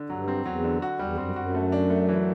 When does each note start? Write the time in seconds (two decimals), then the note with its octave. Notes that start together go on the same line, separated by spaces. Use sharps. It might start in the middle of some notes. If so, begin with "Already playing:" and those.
Already playing: D3
0.10 G2 F#3
0.28 C4
0.46 E2 F#3
0.64 D3
0.82 F#4
0.99 E2 G3
1.18 F#2 C4
1.35 F#2 F#4
1.54 A3
1.72 D4
1.90 A3
2.09 E3